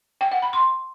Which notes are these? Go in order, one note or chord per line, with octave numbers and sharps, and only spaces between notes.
G5
F#5
B5
C6